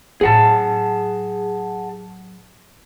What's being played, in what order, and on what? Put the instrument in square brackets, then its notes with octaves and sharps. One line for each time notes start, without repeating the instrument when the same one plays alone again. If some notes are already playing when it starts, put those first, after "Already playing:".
[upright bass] A2 F#3 [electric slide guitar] G#4 F#5 A5